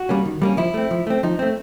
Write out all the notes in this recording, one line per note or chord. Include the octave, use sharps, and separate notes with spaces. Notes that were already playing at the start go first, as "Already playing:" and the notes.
Already playing: F#4
G3 A#3 C#4
D#3
G3 A#3 C#4
F3 E4
A3 C4
F3
A3 C4
F3 D#4
A3 C4